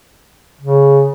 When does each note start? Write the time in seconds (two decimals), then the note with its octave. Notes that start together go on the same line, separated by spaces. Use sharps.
0.61 C#3